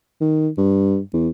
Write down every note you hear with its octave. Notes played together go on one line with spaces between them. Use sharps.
D#3
G2
E2